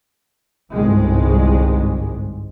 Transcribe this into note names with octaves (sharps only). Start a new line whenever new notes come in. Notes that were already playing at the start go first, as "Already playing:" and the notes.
G1 C2 G#2 G#3